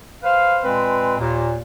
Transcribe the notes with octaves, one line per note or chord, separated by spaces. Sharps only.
B4 C5 F5
A#2 G#3 C4 B4
D#2 A#2